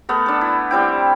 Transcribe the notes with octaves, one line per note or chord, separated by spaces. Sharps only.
A3 B3 A#4
D4 A4
E4
G3 C4 E4 G5